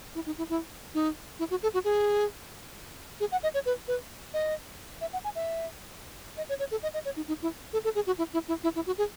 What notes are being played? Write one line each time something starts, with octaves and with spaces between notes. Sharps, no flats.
E4
D#4
E4
E4
D#4
E4
F#4
A4
F#4
G#4
G#4
F#5
D#5
C#5
B4
B4
D#5
E5
F#5
G#5
E5
D#5
C#5
C#5
A4
D#5
D#5
C#5
D#4
D#4
E4
A4
A4
G#4
F#4
E4
E4
E4
E4
E4
F#4
G#4